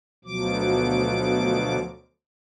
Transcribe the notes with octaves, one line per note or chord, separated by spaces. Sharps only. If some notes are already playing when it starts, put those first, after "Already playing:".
D2 B2 F3 F#3 D6